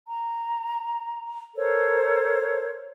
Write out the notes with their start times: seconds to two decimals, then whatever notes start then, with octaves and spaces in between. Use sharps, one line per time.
0.06 A#5
1.55 A4 A#4 C5 C#5